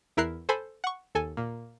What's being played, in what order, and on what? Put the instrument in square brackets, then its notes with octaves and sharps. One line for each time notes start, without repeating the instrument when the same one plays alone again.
[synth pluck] E2 E4 A#4 F6 F#6 C7
A4 C5 G#5 B5
F#5 C#6
D#2 A4 G#5
A#2